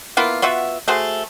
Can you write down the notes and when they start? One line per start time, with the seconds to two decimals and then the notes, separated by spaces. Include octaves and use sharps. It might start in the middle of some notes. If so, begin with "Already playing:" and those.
0.17 A#3 B3 E4 F4
0.42 B3 F4 F#4 E5
0.88 A3 F#4 G#4 C5